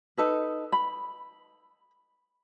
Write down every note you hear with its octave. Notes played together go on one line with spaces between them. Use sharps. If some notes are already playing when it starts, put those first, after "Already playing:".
D#4 A4 B4
B5